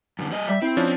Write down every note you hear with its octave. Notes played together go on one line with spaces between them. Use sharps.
F#2 D3
G3 D#5
G3 E5
C4 E4
F3 C#4 D4